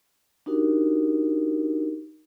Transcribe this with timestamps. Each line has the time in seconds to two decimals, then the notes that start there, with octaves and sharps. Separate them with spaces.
0.46 D4 D#4 F#4 G4 A#4